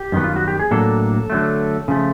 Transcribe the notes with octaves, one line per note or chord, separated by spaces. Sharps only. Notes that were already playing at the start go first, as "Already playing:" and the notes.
Already playing: G4
F#2 D#3 G3 B3
F4
F#4
G4
G#4
A2 F#3 A#3 D4 A4
D3 F#3 A3
C#3 F3 A3